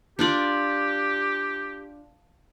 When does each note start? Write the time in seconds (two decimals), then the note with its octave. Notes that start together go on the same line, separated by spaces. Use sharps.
0.19 D4 F4 G4 D5